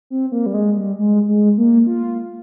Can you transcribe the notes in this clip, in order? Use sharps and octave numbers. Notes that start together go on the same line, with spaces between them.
C4
A#3
G3
G#3
G3
G#3
G#3
A#3
F4